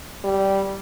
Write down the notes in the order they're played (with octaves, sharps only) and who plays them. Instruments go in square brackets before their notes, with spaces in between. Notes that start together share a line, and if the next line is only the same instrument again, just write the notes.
[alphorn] G3